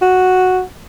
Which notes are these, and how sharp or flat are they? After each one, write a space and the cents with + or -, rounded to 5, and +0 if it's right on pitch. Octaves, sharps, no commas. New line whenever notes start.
F#4 -5